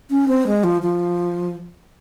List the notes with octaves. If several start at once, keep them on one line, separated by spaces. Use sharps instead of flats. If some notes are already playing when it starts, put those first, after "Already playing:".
C#4
C4
G#3
F3
F3